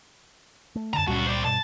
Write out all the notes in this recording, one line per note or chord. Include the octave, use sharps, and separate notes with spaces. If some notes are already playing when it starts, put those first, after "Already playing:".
A3
F#2 D3 A5 A#5
C#2 F#2 A#2 G3 F#4
C5 D5
G2 B2 A5